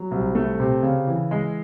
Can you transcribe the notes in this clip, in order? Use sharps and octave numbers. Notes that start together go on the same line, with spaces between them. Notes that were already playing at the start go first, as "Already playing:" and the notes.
Already playing: F#3
C2
A3
C3
C#3
E3
G#3